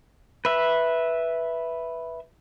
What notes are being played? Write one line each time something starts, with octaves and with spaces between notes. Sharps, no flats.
B4 E5